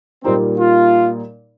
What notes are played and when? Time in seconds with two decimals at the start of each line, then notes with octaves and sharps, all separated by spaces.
0.24 A#2 G3 A#3 C4 D#4
0.59 F4